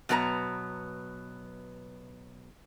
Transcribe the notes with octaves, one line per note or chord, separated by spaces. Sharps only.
B2 F#3 B3 A4 A#5